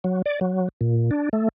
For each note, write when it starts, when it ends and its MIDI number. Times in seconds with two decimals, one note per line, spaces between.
0.04 0.22 54
0.26 0.39 74
0.41 0.69 54
0.81 1.11 46
1.11 1.29 62
1.33 1.48 57